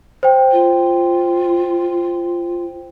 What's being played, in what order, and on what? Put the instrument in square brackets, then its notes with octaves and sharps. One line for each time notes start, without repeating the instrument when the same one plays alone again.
[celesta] C5 G5
[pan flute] F4